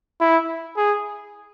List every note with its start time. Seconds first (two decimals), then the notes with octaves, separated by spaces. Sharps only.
0.21 E4
0.77 G#4